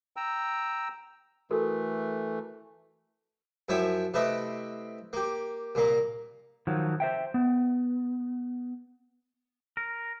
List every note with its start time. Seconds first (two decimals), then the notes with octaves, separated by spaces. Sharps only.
0.16 G5 A#5 E6
1.51 E3 A3 F#4 A4 A#4
3.69 F#2 F3 E4 C#5 E5 G5
4.14 C3 A3 E4 B4 D#5 D#6
5.13 A#3 G4
5.75 C2 A#2 A#3 A#5
6.67 D#3 F3 F#3
7.00 C5 E5 G5
7.34 B3
9.77 A#4